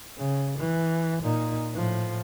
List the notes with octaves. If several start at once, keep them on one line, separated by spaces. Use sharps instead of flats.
C#3
E3
A#2 D#4
A2 F3